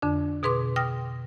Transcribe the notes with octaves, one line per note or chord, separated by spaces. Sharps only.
F2 D3 D4
B2 G#4 B4 C6 D6
G5 D#6 F6 A#6